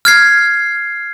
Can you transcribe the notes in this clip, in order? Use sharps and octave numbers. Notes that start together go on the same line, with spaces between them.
F6 G#6 C7